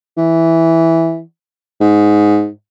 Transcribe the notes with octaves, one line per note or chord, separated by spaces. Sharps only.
E3
G#2